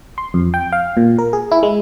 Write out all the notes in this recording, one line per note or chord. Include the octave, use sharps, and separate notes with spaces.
C6
F2
G5
F5
A#2
A#4
G#4
E4
G#3